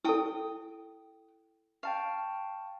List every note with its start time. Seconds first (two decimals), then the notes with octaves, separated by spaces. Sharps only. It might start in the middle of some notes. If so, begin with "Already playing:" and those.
0.04 E4 A4 G5 D#6
1.83 F5 G5 A5 C#6